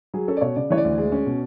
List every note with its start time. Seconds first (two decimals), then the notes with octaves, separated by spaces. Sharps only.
0.14 F#3 G#4
0.28 C#4 A4
0.37 D5
0.41 B2 C#5
0.56 C#3 D5
0.70 E3 C#5
0.78 D5
0.85 D2
0.98 G#3
1.12 C#4
1.26 B2